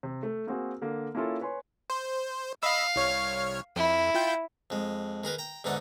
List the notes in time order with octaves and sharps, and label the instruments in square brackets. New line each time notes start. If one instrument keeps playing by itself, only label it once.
[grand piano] C3
A3
A#3 C4 F#4 G#4
D3 A#3
A#3 C#4 E4 F4 A4
B4 C#5 G#5 C6
[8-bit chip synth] C5
[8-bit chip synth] D#5 B5 E6 [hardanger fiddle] F5
[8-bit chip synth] C2 C#5 F6
[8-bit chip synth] F2 [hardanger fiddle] E4
[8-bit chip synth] F4 G5 G6
[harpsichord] F2 G#3
D#3 G#4 A#4 B4
G5 A#5
E2 G#2 D3 D4 D#4 F#5